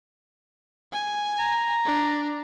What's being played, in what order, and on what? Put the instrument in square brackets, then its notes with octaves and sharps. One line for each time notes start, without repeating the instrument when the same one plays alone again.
[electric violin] G#5
[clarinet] A#5
[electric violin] D4